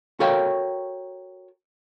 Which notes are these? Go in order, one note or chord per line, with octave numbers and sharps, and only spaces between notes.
F#4 A4 A#4 C#5 F5 G5